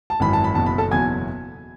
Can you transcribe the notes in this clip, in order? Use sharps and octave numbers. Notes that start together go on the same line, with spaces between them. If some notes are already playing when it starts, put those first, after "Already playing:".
A5
G#1 F#2 E3 B5
A5
B5
F#1 E2 B2 F#3 A5
B5
A4 A5
F#1 E2 B2 F#3 G#5 G#6